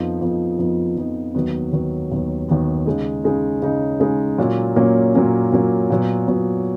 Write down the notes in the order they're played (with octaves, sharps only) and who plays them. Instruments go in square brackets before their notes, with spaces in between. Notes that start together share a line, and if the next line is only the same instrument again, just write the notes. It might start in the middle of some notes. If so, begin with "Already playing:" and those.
Already playing: [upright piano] F2 F3 B3 D#4
F2 F3 B3 D#4
F2 F3 B3 D#4
F2 F3 B3 D#4
D#2 D#3 F#3 B3
D#2 D#3 F#3 B3
D#2 D#3 F#3 B3
D#2 D#3 F#3 B3
C#3 G#3 D#4
C#3 G#3 D#4
C#3 G#3 D#4
C#3 G#3 D#4
A#2 F#3 A#3 C#4
A#2 F#3 A#3 C#4
A#2 F#3 A#3 C#4
A#2 F#3 A#3 C#4
A#2 F#3 B3
A#2 F#3 B3